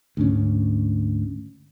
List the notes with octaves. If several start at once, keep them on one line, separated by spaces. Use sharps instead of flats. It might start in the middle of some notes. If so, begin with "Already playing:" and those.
D2 G#2 C#4